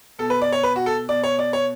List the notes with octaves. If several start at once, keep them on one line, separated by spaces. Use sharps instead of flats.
B2 A4
B4
D5
C#5
B4
F#4
A4
B2 D5
C#5
D5
C#5